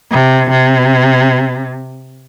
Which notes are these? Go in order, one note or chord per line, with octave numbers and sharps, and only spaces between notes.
C3
C3